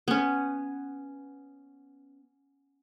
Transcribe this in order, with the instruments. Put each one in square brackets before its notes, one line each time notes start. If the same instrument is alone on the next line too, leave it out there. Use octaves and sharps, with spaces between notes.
[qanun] B3 C#4